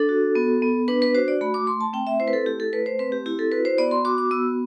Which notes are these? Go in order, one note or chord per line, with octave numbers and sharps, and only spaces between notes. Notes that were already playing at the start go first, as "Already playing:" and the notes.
Already playing: D4 A4
F#4
B3
B3
D4 B4
B4
F#4 C5
D5
A3 B5
D6
A3 C6
A5
C4 G5
E5
E4 C5
B4
A4
A3 G4
A4
A3 B4
C5
C4 B4
G4
E4 G4
A4
F#4 B4
C5
B3 D5
C6
F#4 D6
D6
B3 E6